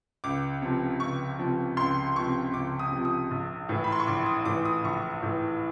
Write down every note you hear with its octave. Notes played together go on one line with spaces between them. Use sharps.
C#2 D6
C3 F3
C#2 C#6
C3 F3
C#2 C6
C3 F3 C#6
C#2 D6
D#6
C3 F3
D#6
A#1
A2 E3
B5
C6
C#6
A#1 D6
D#6
A2 E3 D6
D#6
A#1 C#6
A2 E3